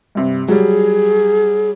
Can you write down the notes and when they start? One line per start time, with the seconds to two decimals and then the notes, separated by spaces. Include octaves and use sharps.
0.15 G2 C3
0.48 F#3 G3 G#4